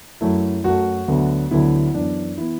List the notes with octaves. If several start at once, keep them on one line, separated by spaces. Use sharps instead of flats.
F#2 F#3 A3 E4
F#2 F#3 A3 F#4
D2 D3 F#3 B3
D2 D3 F#3 B3 E4
F#2 E3 B3 D4
E3 B3 E4